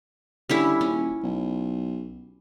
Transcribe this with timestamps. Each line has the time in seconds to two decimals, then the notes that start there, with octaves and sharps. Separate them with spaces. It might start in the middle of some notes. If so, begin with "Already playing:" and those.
0.49 D3 G3 C#4 E4
0.81 D#1 C#4
1.23 B1